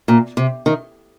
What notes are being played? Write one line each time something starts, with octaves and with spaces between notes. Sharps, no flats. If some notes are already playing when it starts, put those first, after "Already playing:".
A#2
C3
D#3